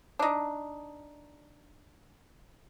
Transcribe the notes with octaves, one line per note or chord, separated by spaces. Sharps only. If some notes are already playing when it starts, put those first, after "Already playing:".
D4 D#4